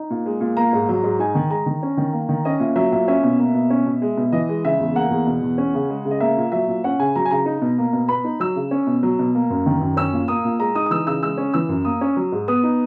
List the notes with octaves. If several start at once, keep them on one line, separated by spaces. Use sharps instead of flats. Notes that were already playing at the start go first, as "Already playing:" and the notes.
Already playing: D#4
A#2
G#3
A#2
A#3 A#5
G#2
F#3
G#2
D#4 G#5
D#3
G#3 A#5
D#3
C#4
D#3
A#3
D#3
C#4 D#5
A#2 E5
F#3 E5
A#2 E5
C#4 E5
B2
A#3
B2
C#4
B2
G#3
B2
E3 D#5
G#3
C#3 E5
E2
A#3 F#5
E2
B2
E2
C#4
C#3
G#3
C#3
D#5
A#3 E5
A#2
F#3 E5
A#2
C#4 F#5
C#3 G#5
F#3 A#5
G#5
C#3 A#5
D#4
B2
A#3
B2
B3 B5
D#4
F#3 E6
C#3
C#4
B2
F#3
B2
A#3
F#2
D#3
F#2
C#4 E6
A#2
A#3 D#6
A#2
G#3 A#5
D#4 D#6
D#6
E3 E6
C#3 E6
G#3 E6
C#4
E3 E6
F#2
A#3 D#6
C#4
F#3
G#2
B3 D#6
D#4